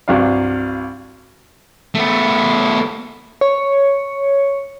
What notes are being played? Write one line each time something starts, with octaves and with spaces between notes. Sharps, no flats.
C2 G2 F#3 D4 F5
A3 B3
C#5